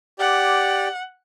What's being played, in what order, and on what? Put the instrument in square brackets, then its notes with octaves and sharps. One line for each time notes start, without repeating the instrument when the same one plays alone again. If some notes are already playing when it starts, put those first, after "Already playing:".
[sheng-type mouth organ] G4 D5 [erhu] F#5